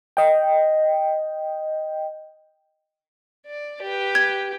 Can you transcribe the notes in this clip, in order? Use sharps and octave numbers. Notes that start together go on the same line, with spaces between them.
D#5 G5
D5
G4 B4
G#6